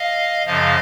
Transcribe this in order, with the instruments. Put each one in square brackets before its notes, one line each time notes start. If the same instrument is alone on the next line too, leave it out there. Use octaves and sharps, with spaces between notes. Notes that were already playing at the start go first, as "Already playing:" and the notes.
Already playing: [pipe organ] D#5 F5
F#2 C#3 F3 D#5 F5